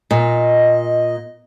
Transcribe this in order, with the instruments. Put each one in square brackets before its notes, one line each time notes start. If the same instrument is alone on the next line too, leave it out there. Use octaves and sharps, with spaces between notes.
[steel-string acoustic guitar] A#2 [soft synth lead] D#5